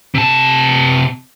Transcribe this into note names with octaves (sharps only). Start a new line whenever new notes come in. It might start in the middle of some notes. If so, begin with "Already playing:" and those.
C3 A5